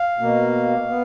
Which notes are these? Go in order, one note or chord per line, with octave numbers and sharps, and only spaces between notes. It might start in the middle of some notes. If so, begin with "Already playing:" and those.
Already playing: F5
B2 A#3
B3